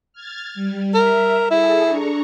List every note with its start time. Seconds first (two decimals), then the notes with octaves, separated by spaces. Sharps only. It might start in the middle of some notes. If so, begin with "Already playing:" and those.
0.13 F6 G#6 A6
0.54 G3
0.94 A#4 E5
1.51 E4 G#4 A4
1.88 D4 A#5 C#6